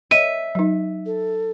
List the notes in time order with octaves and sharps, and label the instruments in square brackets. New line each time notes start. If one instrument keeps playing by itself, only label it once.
[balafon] C#5 D#5 [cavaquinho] E5 [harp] D#7
[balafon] F#3 D#4
[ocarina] A4